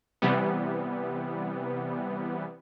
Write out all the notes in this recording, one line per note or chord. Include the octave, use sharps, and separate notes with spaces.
C3 E3 G3 B3